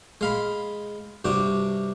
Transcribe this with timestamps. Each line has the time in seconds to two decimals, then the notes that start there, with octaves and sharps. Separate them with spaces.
0.21 G#3 F5 B5
1.25 G2 C3 F#4 D6